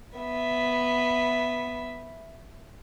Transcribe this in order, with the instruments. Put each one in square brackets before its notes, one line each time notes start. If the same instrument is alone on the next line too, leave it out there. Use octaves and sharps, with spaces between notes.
[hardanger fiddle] B3 E5